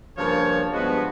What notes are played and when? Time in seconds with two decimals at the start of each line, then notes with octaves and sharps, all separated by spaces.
0.18 G2 C#3 F3 A#3 C#5 A5
0.73 G2 F3 G#3 B3 F#4 B4